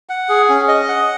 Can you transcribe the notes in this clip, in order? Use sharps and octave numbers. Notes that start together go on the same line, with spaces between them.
F#5
G#4
C#4
D#5
F#5